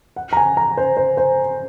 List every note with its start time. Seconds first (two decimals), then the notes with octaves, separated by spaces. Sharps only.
0.16 F#5
0.33 A#5
0.37 G#5
0.57 A#5
0.77 C5
0.97 C5
1.17 C5